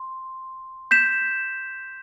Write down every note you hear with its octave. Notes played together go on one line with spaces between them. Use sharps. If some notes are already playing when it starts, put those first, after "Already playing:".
Already playing: C6
G6 B6 E7